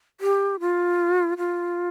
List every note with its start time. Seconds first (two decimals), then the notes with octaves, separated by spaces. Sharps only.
0.21 G4
0.60 F4
1.38 F4